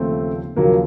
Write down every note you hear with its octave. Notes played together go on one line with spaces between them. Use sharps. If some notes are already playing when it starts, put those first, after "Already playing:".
Already playing: D#2 C#3 F3 A3 C4
D#2 C#3 F3 F#3 A#3